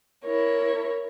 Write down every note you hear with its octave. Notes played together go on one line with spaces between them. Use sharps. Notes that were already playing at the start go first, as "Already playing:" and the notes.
E4 A#4 C#5